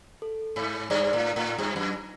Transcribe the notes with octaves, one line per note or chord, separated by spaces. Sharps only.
A4
G#2
G2 D5
A2
A2
G2
F#2